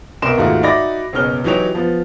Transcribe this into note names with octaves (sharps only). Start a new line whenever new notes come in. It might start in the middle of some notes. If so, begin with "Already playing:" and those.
C2 B2 A#4 C6 E7
D#2 G#2 A3 F4 F#4
D#4 F#4 D5 E5 B5 A#6
F#1 B2 C#4 F6 G7
E3 F#3 D#4 G4 C#5 F7
F3 B3